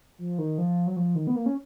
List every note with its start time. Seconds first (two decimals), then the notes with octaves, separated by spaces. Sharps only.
0.19 F3
0.39 D#3
0.58 F3
0.87 F#3
0.96 F3
1.15 D#3
1.27 B3
1.36 A#3
1.46 C#4